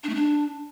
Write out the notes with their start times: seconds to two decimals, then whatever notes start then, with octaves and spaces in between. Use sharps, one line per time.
0.04 D4
0.09 A3
0.15 D4